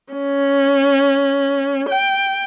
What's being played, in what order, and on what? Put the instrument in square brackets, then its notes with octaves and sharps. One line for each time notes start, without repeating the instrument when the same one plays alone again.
[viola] C#4
G5